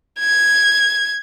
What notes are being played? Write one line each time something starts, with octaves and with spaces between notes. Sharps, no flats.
G#6